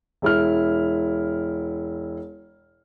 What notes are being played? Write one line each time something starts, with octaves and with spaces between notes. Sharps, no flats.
E1 E4 F6